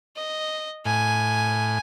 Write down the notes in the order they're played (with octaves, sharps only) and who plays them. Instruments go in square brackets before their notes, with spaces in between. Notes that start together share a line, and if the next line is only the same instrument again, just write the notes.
[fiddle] D#5
[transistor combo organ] A2 [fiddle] G#5